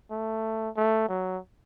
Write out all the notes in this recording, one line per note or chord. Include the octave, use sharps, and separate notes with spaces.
A3
A3
F#3